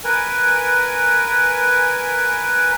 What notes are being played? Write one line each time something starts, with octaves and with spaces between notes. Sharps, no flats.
A#4 B4 G#5